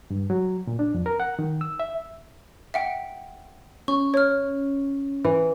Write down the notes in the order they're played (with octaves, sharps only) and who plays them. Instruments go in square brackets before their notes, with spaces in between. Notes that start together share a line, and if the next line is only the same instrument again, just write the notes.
[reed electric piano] G2
F#3
A#2
D4
F2
A#4
F#5
D#3
E6
E5
[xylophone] E5 F#5 G5
[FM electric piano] C#4 [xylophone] C#6
[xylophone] C#5 F6
[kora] E3